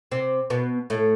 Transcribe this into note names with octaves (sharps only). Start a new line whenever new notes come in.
C3 C4
B2 B3
A2 A3